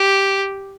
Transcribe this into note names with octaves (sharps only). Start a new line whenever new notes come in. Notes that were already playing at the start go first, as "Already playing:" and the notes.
Already playing: G4